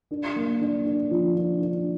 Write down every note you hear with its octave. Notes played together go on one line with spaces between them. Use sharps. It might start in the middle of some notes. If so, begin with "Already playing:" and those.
D4
A#3
D4
D4
F3
D4
D4